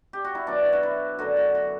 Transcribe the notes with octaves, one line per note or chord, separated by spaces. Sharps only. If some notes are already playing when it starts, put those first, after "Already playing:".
G4
F#4
E4
B2 F#3 D4
F#4
E4
F#2 D3 F#3 F#4
F#4
F#4